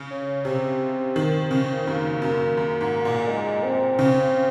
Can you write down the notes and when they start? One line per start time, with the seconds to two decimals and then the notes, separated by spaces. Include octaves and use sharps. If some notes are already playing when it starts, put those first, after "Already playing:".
Already playing: C#3
0.10 C#4
0.45 C3 C4
1.16 D#3
1.51 C#3
1.86 F#2 A#3
2.22 F#2
2.57 F#2
2.81 G#2
3.05 A#2
3.27 G#3
3.63 C4
3.99 C#3